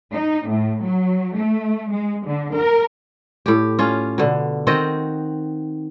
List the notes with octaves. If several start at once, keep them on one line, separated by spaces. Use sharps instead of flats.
D#4
A2
F#3
A3
G#3
D3
A#4
A2 G4
C#4 F4
B2 D3
D#3 C4 F#4 D#5